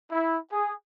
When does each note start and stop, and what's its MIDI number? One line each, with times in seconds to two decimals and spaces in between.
0.12 0.38 64
0.52 0.73 68